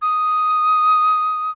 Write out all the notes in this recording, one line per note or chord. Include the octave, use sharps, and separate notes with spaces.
D#6